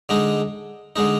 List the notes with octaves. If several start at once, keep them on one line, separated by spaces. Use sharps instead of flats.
D3 G#3 D#4
D3 G#3 D#4